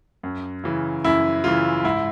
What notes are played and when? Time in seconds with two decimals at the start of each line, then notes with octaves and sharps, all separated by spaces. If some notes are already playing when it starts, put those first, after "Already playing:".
0.23 F#2
0.64 C#3 E3
1.04 F#2 E4
1.44 C#3 E3 F4
1.84 G#2 E4